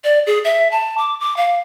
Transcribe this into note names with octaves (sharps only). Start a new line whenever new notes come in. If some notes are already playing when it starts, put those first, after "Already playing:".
D5
G#4
E5
A5
D6
D6
F5